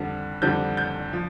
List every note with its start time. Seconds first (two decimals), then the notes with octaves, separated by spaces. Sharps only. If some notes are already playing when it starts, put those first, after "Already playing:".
Already playing: F2 D3 G3
0.42 F2 D3 G3 G6
0.77 G6
1.13 F3